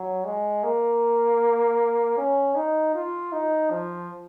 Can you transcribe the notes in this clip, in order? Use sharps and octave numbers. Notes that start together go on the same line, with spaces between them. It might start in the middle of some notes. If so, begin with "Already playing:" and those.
Already playing: F#3
G#3
A#3
C#4
D#4
F4
D#4
F3